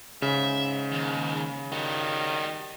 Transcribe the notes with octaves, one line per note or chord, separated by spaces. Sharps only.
G#2 C#3 E5
D#2
D#3 G3 F#4